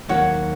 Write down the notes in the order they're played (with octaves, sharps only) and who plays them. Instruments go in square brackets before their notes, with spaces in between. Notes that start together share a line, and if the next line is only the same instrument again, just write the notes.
[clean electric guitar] D#2 D#3 F#3 A#3 [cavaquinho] C#5 F#5